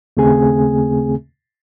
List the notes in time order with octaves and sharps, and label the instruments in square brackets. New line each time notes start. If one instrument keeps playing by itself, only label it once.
[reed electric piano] D#2 C#3 A3 C4 G#4 G#5